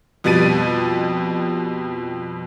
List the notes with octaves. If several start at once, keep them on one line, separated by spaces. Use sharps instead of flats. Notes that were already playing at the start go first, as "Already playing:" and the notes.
F2 B2 G3 A6 D#7